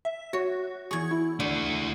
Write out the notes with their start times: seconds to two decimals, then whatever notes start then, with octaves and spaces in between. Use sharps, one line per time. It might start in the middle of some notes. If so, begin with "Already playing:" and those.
0.05 E5
0.33 F#4 C#5
0.91 E2 G#4 C#6 G#6
1.11 E4
1.40 A3 D4 F#4